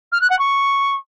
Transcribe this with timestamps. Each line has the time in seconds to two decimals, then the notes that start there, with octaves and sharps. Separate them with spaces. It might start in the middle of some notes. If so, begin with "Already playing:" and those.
0.12 F6
0.21 F#6
0.30 F#5
0.39 C#6